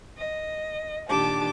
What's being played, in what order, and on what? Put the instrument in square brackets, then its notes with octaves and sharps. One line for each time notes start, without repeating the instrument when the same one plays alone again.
[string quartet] D#5
A#2 D#3 D4 G4 A5 D6